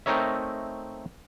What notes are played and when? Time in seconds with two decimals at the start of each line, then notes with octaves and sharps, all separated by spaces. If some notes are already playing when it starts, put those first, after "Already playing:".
0.06 A3 C4 D#4 A#4 C#5 E5